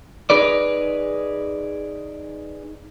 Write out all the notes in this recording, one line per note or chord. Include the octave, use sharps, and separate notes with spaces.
D#4 G#4 B4 D5